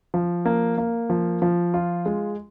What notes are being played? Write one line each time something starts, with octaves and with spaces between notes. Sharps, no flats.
F3
A#3
A#3
F3
F3
F4
G#3